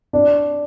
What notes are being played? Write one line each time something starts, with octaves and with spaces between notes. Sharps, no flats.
D4